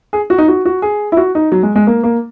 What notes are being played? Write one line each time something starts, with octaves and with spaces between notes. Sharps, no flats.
G#4
F#4
D#4
F#4
F#4
G#4
E4
F#4
D#4
F#3
G#3
G#3
A#3
A#3